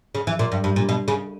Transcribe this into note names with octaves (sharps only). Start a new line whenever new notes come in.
C#3
E3
A#2
G2
G2
A#2
B2
C#3